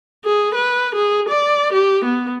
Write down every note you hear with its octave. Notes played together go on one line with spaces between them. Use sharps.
G#4
B4
G#4
D5
G4
B3